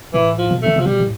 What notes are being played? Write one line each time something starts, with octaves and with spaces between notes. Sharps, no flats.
A2 E3
F3
B2
D3 A3
C3 F3
B2 G3
A2